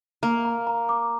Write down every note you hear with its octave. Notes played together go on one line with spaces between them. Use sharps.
A#3 A#5
A#5
A#5
D6